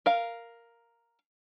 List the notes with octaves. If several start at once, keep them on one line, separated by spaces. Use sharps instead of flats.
A#4 F5